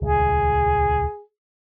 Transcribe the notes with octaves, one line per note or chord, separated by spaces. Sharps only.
D#1 C#2 G#4